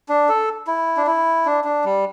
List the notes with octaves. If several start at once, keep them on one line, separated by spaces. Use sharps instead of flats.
D4
A4
E4
D4
E4
D4
D4
G3